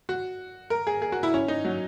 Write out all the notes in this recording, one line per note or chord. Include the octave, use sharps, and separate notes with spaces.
F#4
A#4
G#4
G#4
F#4
E4
C#4
D#4
F#3